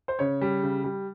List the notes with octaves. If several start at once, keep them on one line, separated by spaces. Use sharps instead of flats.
C5
C#3 C#5
G3
C#3
G3